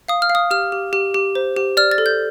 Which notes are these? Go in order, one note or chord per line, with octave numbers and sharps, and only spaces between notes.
F5 D#6
F6
F5
D#6
G4 F6
G4
G4
G4
C5
G4
D5 F6
A6
A4
G6